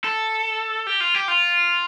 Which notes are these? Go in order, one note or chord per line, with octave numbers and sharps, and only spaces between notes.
A4
G4
F4
G4
F4